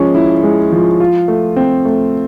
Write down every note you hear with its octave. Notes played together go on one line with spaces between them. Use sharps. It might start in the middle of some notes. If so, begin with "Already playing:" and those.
Already playing: F3 G#3 C#4
E4
G#3
F3
F4
A3
C4
A3